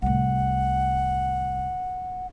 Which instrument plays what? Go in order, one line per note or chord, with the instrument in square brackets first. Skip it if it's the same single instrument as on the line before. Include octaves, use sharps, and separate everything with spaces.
[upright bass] C2 A2 [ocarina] F#5